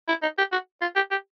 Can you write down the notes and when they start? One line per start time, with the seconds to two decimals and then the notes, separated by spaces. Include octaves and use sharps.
0.08 E4
0.22 D#4
0.38 G4
0.52 F#4
0.81 F4
0.96 G4
1.11 G4